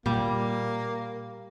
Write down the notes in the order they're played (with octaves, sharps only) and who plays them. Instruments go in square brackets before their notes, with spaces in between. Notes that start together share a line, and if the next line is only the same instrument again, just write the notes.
[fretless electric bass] A#2 [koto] G3 [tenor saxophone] A#3